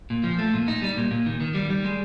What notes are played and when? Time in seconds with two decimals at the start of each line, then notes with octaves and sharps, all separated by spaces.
0.10 A#2
0.24 F3
0.39 A3
0.54 A#2
0.68 D#4
0.82 G3
0.97 A#2
1.11 A#2
1.26 D#3
1.40 D#3
1.54 G3
1.70 G3
1.85 G#3